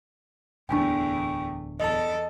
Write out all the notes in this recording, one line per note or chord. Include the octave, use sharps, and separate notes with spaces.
D1 E2 A3 D4 G5 G#5 C#6
E2 A4 D#5 A5